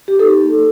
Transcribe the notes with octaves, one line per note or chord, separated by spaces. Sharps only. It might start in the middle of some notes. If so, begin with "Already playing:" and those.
G4
D#4 A4
A#3